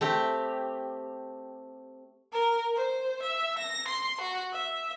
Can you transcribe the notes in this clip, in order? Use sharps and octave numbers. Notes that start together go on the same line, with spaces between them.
A3 C4 G4
A#4
C5
E5
A#6
C6
F#4
E5